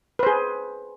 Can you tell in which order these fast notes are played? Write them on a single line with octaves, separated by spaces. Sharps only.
B4 C5 G#4